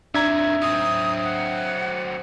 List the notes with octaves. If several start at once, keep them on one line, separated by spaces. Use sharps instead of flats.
F2 D#3 D4 E5 A#5 G#6
F#3 C4 D#6
F#5